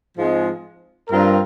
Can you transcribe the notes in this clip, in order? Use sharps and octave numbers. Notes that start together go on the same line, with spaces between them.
G#2 F3 G#3 C4
G2 G3 C4 F4 A#4